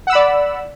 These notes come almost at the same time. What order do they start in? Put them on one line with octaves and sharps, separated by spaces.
F#5 E6 B5 D5